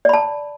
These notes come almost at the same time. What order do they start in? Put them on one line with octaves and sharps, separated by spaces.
D5 B5 A5